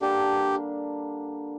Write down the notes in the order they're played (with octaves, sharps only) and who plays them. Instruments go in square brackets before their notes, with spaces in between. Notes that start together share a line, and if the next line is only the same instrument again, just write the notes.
[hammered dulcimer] D3 G3 A#3 D4 [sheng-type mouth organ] G4